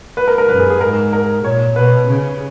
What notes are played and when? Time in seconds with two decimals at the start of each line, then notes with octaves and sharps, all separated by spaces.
0.17 B4
0.28 A#4
0.38 A#4
0.49 F#2 B4
0.60 G#4
0.70 G#4
0.81 G#2 A#4
1.13 A#4
1.44 A#2 C#5
1.76 B2 B4
2.08 C#3